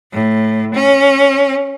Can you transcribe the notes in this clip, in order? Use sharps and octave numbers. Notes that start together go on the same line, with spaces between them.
A2
C#4